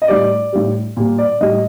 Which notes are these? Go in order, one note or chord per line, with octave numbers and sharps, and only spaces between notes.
D#5
A2 G3 D5
A2 G3
A#2 G3
D5
A2 G3 D#5